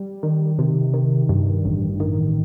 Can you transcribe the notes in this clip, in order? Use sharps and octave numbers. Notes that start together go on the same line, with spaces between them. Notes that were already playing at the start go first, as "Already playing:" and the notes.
Already playing: G3
D#3
C3
D#3
G2
A1
D#3